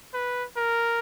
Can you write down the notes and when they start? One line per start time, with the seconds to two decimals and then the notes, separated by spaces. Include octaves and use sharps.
0.14 B4
0.57 A#4